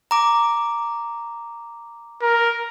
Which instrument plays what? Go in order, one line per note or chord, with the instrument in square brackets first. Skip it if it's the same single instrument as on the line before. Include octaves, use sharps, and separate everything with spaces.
[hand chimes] A#5 D6
[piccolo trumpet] A#4